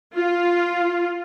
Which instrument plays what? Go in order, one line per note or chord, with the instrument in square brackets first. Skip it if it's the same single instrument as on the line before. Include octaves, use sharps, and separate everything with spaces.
[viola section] F4